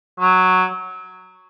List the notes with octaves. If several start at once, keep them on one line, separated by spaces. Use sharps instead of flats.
F#3